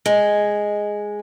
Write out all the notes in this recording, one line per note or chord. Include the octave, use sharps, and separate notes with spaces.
G#3